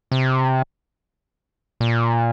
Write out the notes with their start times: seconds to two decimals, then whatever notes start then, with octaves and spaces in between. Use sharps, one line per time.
0.12 C3
1.80 A#2